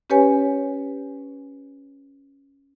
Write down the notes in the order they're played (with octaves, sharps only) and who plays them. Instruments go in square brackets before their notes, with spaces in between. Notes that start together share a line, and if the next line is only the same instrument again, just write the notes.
[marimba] C#4 G4 B4 C#5 G#5